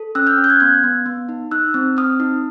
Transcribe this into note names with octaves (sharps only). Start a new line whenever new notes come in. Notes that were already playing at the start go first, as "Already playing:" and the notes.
Already playing: A4
C#4 E6 F#6
F6 G6
C#4
G6
F#6 G#6
B3 F#6 G#6
B3
B3
D#4
D#4 E6 F#6
C4
C4 D#6 F6
D#4